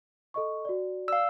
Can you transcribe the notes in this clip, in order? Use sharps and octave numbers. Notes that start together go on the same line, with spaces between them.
A4 D#5 C#6
F#4 D5
D5 F5 E6